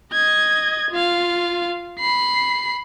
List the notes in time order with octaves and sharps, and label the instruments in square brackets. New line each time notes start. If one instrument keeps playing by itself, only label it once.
[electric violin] D#5 G#6
F4 F5
B5 C7